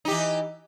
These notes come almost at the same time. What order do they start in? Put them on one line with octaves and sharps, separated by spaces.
D#4 G4 E3